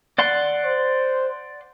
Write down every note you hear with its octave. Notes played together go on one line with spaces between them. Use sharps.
D5 F#5 C6
C5